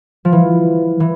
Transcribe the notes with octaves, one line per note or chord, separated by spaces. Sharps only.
F3
E3
E3